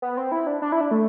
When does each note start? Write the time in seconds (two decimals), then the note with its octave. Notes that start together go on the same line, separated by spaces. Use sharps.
0.02 B3
0.17 C4
0.32 E4
0.47 D4
0.62 D4
0.72 E4
0.81 D4
0.91 A3